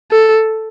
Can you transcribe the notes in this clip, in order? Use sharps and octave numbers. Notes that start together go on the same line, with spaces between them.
A4